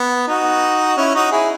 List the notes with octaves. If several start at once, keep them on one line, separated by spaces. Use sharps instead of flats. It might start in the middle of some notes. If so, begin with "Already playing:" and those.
Already playing: B3
D#4 F#4
C#4 E4
D#4 F#4
E4 G#4